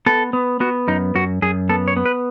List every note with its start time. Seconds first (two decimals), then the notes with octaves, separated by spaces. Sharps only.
0.06 B3 A4
0.33 B3
0.60 B3 F#4
0.88 F#2 D#4
1.15 F#2 F#4
1.42 F#2 G#4
1.69 B3 A4
1.88 C#5
1.97 B3
2.05 B4